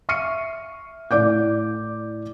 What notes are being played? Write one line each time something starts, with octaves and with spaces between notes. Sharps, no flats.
E5 C#6 F6 C7 C#7 D#7
A2 E4 D5 D6 G6